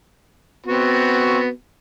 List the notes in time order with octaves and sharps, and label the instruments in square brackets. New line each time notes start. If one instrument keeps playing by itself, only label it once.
[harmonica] B3 C4 F#4